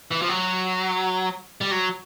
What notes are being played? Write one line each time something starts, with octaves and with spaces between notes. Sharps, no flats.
E3
F3
F#3
G3
F#3